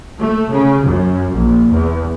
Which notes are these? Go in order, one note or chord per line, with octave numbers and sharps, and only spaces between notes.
A3
C#3
F#2
A#1
E2